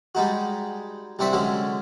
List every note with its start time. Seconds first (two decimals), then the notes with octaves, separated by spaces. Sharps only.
0.15 G3 G#3 D#4 F#4
1.19 C2 C3 C4 D4 E5 C#6
1.33 D3 F#3 G#3 C#4